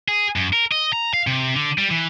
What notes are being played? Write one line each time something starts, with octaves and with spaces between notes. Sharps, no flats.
G#4
F#2
A#4
D#5
A#5
F5
C3
D3
G3
E3